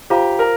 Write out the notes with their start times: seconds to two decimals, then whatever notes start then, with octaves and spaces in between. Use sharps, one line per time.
0.10 F4 G4 C5 F5 A#5
0.39 A#4